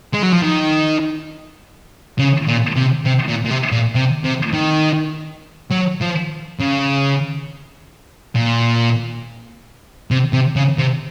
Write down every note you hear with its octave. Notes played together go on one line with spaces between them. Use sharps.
G#3
F#3
F3
D#3
C#3
A#2
C3
C3
A#2
A#2
C3
A#2
C3
C3
D#3
F#3
F3
C#3
A#2
C3
C3
C#3
C3